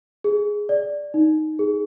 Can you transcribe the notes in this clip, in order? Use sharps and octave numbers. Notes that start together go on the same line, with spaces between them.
G#4
D5
D#4
G#4